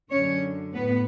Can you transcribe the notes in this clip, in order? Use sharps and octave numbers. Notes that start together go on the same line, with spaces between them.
F#2 D3 C#4 C#5
A2 B3 B4